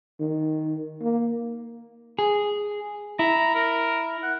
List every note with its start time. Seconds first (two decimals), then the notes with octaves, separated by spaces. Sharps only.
0.20 D#3
1.01 A#3
2.19 G#4
3.19 E4 A#5
3.55 A#4
4.23 F#5